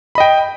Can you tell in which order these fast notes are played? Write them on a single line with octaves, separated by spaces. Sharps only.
B5 D#5 G5